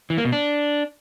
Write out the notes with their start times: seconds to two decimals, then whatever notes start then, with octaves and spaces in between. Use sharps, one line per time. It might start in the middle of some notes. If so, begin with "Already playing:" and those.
0.10 E3
0.17 A#3
0.25 B2
0.32 D4